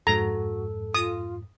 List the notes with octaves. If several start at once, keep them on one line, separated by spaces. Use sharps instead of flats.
F2 G#2 F#4 A4 A#5
F4 D#6